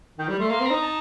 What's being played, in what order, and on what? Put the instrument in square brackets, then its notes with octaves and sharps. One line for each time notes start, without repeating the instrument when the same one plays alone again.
[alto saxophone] D#3 [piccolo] G5
[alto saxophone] G3
[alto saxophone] A3 [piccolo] C6
[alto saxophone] A#3 [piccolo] C6
[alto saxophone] C4
[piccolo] A#5
[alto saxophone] D#4
[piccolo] A5